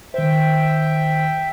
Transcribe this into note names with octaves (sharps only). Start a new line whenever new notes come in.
D#3 C5 E5 G5